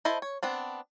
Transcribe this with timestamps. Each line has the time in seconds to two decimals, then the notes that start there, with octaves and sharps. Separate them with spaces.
0.05 E4 A4 C5 D#5
0.22 C#5
0.43 B3 C4 D4